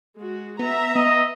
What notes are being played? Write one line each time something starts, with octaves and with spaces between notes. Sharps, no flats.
G#3 F#4
B3 E5 A#5
B3 D#5